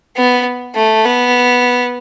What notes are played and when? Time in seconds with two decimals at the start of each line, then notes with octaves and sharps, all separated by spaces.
0.16 B3
0.75 A3
1.05 B3